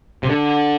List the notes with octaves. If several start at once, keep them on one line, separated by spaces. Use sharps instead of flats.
C3
D3